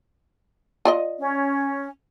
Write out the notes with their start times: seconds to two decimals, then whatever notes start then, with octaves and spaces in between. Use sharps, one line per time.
0.85 F4 D5 D#5
1.19 C#4